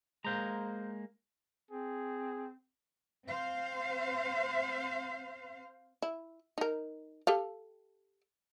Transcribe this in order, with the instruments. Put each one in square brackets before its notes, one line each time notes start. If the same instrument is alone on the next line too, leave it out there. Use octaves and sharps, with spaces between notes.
[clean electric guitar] G#3 A#3 [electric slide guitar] C5 A#5
[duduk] C4 [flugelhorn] G#4
[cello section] C4 C5 F5
[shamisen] E4
D#4 A#4
G4 A4 F5